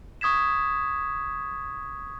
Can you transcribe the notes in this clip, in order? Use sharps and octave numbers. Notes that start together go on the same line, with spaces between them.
C#6 D#6 G#6 B6 E7